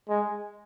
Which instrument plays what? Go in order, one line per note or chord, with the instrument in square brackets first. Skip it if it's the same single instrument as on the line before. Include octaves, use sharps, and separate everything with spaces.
[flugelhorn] G#3